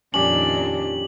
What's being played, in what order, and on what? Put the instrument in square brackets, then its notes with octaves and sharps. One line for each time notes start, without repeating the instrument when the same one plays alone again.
[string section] F2 D#3 [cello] A#2 D4 [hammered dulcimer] C#4 G4 [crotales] F#7